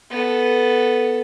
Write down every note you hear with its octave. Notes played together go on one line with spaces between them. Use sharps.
B3 A4